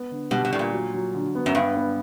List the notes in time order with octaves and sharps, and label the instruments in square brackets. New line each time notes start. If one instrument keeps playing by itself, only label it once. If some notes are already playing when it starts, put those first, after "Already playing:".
Already playing: [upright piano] B3
D3
[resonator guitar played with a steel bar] B2 [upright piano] G3
[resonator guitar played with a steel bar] B2
[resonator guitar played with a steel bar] A2 [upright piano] D4
[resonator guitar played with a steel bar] A#2
[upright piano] F#3
F#3
D3
B3
[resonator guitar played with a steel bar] F#2
[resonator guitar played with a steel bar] G2 [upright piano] B3
[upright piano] B3